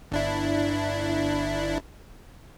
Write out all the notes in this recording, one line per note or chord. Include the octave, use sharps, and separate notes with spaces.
G1 D4 E4